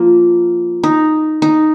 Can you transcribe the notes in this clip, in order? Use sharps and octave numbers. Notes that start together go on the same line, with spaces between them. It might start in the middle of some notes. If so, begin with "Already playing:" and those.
Already playing: F3 A#3
D#4
D#4